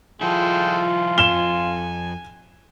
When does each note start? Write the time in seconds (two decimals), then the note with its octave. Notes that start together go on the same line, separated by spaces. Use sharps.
0.21 F3 G#3 E4 F4 A4 G5
1.18 F2 G#5 E7 G7